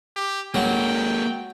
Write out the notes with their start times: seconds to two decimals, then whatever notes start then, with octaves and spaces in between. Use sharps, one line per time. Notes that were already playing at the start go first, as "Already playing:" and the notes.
0.17 G4
0.54 D1 F#3 G#3 A#3 G5